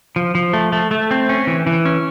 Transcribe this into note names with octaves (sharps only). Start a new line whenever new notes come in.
F3
F3
A3
A3
A3
C4
C#4
E3
E3
C#4